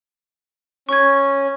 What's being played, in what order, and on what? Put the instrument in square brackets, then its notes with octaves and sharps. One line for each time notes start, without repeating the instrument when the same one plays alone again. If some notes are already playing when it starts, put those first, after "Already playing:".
[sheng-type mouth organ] C#4 [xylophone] C#6 G#6